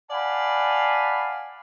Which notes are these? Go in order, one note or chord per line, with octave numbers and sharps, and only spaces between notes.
D5 F5 F#5 G#5 A5 B5